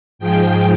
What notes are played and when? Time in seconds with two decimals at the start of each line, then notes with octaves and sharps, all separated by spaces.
0.19 G#2 F3 G#3 G5